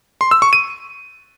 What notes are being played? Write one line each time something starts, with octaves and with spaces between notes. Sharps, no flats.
C6
E6
C#6
D#7